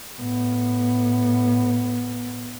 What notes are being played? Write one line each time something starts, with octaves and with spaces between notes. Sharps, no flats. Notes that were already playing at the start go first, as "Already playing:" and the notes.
A2 B3